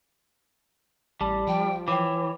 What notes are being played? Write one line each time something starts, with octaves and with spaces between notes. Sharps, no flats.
A1 G3 A5
F3 G5
E3 C#5 G5 D6